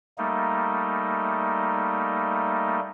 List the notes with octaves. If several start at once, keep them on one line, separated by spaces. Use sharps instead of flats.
G3 A3 A#3 D#4